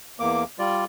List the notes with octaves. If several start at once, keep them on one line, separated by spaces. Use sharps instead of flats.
E2 A#3 D6
G3 F4 D5